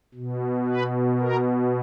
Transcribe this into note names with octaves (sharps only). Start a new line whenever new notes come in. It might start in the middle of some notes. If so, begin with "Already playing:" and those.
B2
B4
A#4